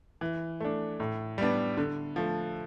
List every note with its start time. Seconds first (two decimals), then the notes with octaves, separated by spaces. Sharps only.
0.21 E3
0.60 A3 D4
1.00 A2
1.38 G3 B3 D4
1.77 D3
2.16 F3 A3